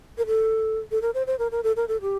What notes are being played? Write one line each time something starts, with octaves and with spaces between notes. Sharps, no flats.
A#4
A4
A4
A#4
C5
C5
A#4
A#4
A4
A#4
A4
G4